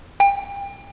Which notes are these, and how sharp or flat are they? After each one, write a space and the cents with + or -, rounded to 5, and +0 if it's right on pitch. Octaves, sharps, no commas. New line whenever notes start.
G5 +30